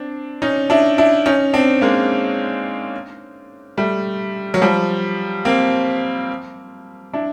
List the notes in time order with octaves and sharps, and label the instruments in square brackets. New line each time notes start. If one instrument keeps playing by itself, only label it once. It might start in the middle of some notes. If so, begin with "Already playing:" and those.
Already playing: [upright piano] C4 D4
C#4 D#4
D4 E4
D4 E4
C#4 D#4
C4 D4
G#3 A#3
G3 A3
F#3
F3 G3
A#3 C4
D4 E4